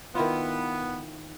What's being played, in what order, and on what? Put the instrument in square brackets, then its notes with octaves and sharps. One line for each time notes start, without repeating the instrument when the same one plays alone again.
[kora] D#3 E4 F4 [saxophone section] B3